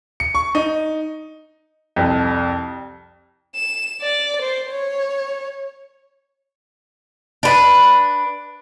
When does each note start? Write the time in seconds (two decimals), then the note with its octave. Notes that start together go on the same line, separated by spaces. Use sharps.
0.20 C#7
0.35 C#6
0.55 D#4
1.96 C2 F2
3.56 E7
4.02 D5
4.42 C5
4.71 C#5
7.43 D4 B4